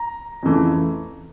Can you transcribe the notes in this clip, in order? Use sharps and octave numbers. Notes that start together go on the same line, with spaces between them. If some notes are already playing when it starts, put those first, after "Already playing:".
Already playing: A#5
F2 C#3 E3 A3